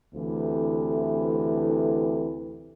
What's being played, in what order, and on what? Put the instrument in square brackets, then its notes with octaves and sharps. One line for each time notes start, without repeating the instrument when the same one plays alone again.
[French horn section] D2 C3 E3